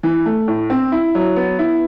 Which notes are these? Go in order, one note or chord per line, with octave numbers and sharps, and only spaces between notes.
E3
A3
A2
C4
E4
F#3
B3
E4